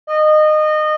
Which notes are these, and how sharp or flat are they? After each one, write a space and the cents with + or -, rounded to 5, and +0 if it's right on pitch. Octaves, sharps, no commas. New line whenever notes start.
D#5 -25